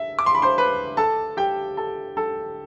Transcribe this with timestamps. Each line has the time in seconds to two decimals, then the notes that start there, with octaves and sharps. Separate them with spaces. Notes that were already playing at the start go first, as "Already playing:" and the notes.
Already playing: E5
0.19 D6
0.26 C6
0.35 B5
0.42 C5 C6
0.58 B4 B5
0.97 A4 A5
1.37 G4 G5
1.77 A4 A5
2.17 A4 A5